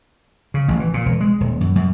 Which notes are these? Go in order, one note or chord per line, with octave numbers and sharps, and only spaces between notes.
C#3
A1
E3
A#2
E1
G#3
D#1
F#2
F#2